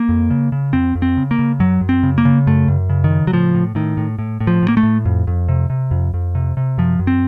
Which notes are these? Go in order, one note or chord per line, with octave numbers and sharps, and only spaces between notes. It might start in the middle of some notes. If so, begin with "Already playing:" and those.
Already playing: A#3
F2
C#3
C#3
F2 C4
F2
C4
C#3
A#3
C#3
F#2 F#3
F#2
C4
C#3
A#3
C#3
F#2 A3
F#2
C#3
D#3
C#3
F#3
A2 F3
A2
A2 D#3
A2
A2
A2
F3
A2
A#3
A3
A2
F2
F2
C3
C3
F2
F2
C3
C3
F#2 F3
F#2
C4